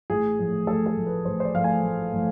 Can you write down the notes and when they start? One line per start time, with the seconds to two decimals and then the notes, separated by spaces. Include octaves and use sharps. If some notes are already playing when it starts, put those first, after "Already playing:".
0.10 A1 G#4
0.39 A2 F3 A3
0.67 A1 A4
0.86 A4
0.96 A2 F3 A3
1.06 B4
1.25 A1 C5
1.40 C5
1.45 D5
1.54 A2 F3 A3 F5
1.64 G#5
1.83 A1
2.13 A2 F3 A3